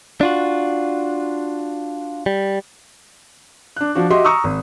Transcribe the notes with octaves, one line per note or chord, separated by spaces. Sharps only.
D4 F4 F#4
G3
D4 F#6
F3 D4 F#4
F#4 G4 D#5 E5 C6
A#5 C#6 D#6 E6
G#1